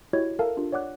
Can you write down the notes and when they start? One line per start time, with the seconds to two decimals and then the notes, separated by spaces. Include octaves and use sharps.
0.13 E4 F#4 G4 C#5 D#5 G#6
0.39 A4 A#4 E5 F5 A5
0.57 D4 F4 G4
0.72 C#5 D5 F#5 D6 F#6